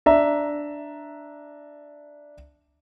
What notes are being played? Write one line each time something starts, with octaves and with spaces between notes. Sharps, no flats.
D4 E5 A#5